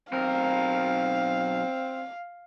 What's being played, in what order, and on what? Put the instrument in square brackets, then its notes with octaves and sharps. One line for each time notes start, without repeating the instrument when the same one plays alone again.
[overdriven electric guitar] B1 A#4 [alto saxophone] C4 [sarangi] F5